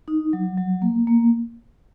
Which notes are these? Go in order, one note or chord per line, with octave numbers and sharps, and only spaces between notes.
D#4
F#3
F#3
A#3
A#3